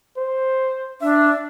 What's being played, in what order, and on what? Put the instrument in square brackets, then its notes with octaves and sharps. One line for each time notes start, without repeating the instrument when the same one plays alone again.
[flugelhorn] C5
[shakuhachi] D4 [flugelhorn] E5